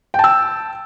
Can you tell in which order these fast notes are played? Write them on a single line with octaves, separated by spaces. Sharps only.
G5 A5 E6